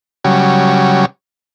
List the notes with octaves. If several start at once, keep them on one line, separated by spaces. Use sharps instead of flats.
C#3 F#3 G3